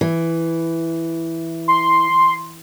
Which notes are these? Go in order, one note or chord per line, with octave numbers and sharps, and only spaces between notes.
E3
C6